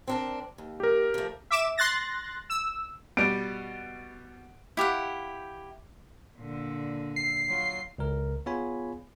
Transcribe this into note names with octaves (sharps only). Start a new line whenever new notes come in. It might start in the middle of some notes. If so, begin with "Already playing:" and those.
C4 D4 A#4
D#2
G4 A#4
F3 A3
E5 D6 E7
C6 F#6 A6 A#6
E6
B2 G3 D7
E4 G4 F5 F#5
A#2 D3
C7
F#3 F4
C#2 A#4
B3 F4 G#4 C#5 G#5 B5